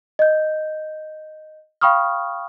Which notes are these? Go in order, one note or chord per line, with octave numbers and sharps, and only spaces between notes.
D#5 G6
F5 G5 B5 C#6 D#6 F6